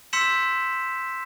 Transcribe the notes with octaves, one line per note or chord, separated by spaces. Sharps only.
C6 E6 G6 B6 C#7 E7